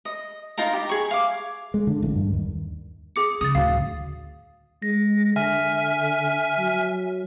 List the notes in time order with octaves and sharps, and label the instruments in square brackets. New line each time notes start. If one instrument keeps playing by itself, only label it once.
[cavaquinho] D#5
D#4 F4 A#4 A#5
G4
G#4 C#6
F5 D6
[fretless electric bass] G#3
D3
A1
G2
D#2
[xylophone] G#4 D6 C#7
[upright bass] C#3 [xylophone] D#6 A6
[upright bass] D2 A2 [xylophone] F5
[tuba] G#3 [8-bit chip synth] A#6
[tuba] D3 [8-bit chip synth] E5 G#5 F6
[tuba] F#3